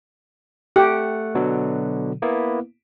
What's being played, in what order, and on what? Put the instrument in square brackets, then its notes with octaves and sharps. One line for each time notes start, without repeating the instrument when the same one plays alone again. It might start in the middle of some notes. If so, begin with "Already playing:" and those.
[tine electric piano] A3 F#5 [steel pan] G4
[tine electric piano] B2 D3 F#3
A#3 B3 E4